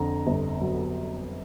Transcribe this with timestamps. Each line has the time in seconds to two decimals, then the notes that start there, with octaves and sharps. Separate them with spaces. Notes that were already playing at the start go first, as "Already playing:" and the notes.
Already playing: F2 D3 A#5
0.27 G1
0.61 F#3